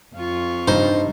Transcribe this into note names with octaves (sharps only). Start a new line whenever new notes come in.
F2 F4 C#6
G2 D#4 C5